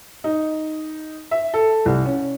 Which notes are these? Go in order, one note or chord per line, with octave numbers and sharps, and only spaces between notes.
D#4
E5
A4
C2
C#4